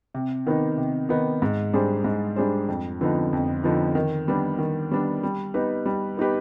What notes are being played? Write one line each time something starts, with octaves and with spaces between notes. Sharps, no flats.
C3
D#3 B3 D#4
C3
D#3 B3 D#4
G#2
G3 D4 G#4 C5
G#2
G3 D4 G#4 C5
F2
D3 F3 B3 D#4
F2
D3 F3 B3 D#4
D#3
G3 B3 D4
D#3
G3 B3 D4
G3
B3 D#4 G4 B4
G3
B3 D#4 G4 B4